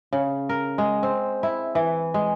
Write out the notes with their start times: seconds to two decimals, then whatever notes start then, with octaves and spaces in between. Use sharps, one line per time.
0.13 C#3
0.49 A#4
0.78 G#3
1.03 C4
1.43 E4
1.75 E3
2.14 G#3